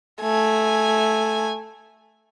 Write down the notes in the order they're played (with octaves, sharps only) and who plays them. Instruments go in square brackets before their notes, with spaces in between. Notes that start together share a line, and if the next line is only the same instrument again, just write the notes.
[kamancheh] A3 G#5